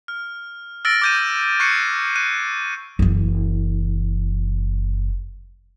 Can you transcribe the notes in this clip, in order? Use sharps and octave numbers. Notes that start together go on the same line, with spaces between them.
F6
E6 F6 A6 A#6 D7
D6 G6 D#7
C#6 F#6 G#6 C7 C#7 D#7
F#6 D#7
F#1 E3